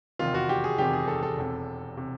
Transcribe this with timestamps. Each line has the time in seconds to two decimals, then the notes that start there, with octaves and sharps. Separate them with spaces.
0.19 F1 E2 C3 D#3 F4
0.34 F#4
0.49 G4
0.64 G#4
0.78 F1 E2 C3 D#3 G4
0.93 G#4
1.08 A4
1.23 A4
1.37 E1 E2 C3
1.97 C3